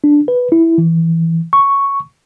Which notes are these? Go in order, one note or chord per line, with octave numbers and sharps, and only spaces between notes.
D4
B4
E4
E3
C#6